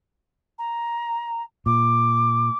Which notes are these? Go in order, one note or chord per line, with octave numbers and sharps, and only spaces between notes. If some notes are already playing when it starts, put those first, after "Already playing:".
A#5
A#2 D6